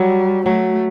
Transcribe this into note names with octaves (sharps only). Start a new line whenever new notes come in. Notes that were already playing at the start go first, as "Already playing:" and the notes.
Already playing: F#3 G3
F#3 A3